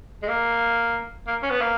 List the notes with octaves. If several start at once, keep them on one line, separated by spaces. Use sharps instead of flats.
G#3
A#3
A#3
C#4
B3
A#3